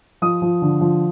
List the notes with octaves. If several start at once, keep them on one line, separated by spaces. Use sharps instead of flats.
F3 D#6
F3
D3
F3